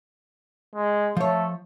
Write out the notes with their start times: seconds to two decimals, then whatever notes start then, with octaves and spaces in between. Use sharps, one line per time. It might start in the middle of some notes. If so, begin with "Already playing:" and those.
0.75 G#3
1.17 F3 A3 C#5